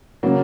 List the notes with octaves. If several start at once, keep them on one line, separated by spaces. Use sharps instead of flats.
C#3 F#3 A#3